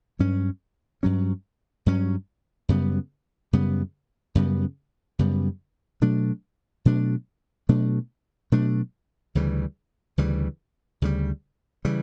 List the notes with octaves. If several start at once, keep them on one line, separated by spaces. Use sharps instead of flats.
G2 F#3 C#4
G2 F#3 C#4
G2 F#3 C#4
F#2 C#3 G3 B3
F#2 C#3 G3 B3
F#2 C#3 G3 B3
F#2 C#3 G3 B3
B2 F#3 A3 D4
B2 F#3 A3 D4
B2 F#3 A3 D4
B2 F#3 A3 D4
D2 C#3 E3 G3
D2 C#3 E3 G3
D2 C#3 E3 G3
C#3 E3 G3